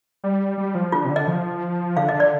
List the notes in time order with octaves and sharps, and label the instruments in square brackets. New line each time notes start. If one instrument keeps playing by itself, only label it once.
[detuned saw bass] G3
G3
F3
[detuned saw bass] D3 [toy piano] F4
[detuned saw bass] C3
D3
[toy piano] D#5
[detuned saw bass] F3
[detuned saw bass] D3 [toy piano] F5
[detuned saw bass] D3 [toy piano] D#5
[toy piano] D5